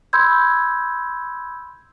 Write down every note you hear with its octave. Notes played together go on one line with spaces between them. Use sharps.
B5 C6 E6 G6 G#6